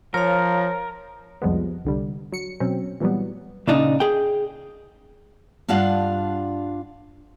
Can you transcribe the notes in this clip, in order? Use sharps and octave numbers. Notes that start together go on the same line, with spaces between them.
F3 A#4 C#5 F5
C2 F2 F3 G3 G#3 B3
C2 D3 G3
F#3 C#7
B2 F#3 C4 C#4
A#2 E3 F#3 G3 B3
A#2 C#3 D4 D#4
G#4 G5
G2 D4 F4 F5 F#5